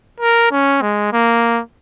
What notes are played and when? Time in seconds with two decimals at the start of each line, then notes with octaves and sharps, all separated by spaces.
0.20 A#4
0.51 C#4
0.81 G#3
1.12 A#3